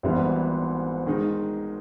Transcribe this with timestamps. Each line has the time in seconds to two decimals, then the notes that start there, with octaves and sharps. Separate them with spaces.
0.03 G#1 G#2 E3 G3 B3
1.06 D#3 G#3 D#4